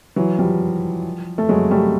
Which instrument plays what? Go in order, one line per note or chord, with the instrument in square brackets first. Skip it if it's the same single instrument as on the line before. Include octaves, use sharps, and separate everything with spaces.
[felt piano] E3 F#3
F3 G3
A3
F#3 G#3
G3 A3